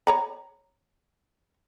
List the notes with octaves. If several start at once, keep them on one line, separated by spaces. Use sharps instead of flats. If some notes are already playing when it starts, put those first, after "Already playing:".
C#5 A#5 B5